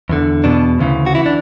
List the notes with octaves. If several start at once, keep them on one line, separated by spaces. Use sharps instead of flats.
E2 D3
E2 B2 D4
D2 C#3 E3
F#4
E3 E4
D4